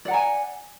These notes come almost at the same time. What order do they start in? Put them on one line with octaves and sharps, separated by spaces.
D5 F#5 A#5 G#5